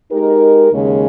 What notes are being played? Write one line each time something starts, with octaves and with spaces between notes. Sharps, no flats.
G#3 D#4 G4 A#4
D#2 C#3 G#3 C#4